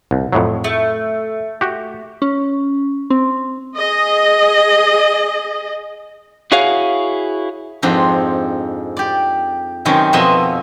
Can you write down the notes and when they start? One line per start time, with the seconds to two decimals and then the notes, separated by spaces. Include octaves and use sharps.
0.11 C2
0.33 F2 A2 F#3
0.64 A3
1.61 F#4 G4
2.22 C#4
3.10 C4
3.77 G#4 D#5
6.52 E4 F#4 G#4 C#5 F5
7.83 F2 G#2 C4 D4
8.97 G4 D5
9.85 F#2 C3 D#3 C#4 G5
10.13 F2 B2 F3 D#5 E5 C6